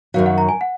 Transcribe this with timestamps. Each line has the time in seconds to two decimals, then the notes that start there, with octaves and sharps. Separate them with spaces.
0.14 F#2 D#3 F#3 F5
0.26 F#5
0.38 A#5
0.49 G#5
0.61 F#5